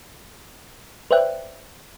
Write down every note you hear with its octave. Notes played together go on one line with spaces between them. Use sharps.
B4 C5 D5 E5 G5 F#6